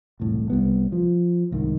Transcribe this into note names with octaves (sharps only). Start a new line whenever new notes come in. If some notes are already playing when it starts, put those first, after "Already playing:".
E1 C2 A2
C2 G3 B3
F3
F#1 C2 G#2 D#3